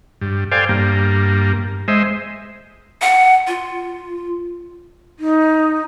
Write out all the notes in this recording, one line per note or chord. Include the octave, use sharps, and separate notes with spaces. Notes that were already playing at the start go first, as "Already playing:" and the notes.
G2
A4 C5 D5 F5 G5 G#5
G2 A#3
G#3 C5 D#5 E5
F#5
F4
D#4